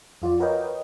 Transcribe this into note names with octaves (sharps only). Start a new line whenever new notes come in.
F2 F4 F#4 D5
F#4 A#4 B4 C#5 D#5 G5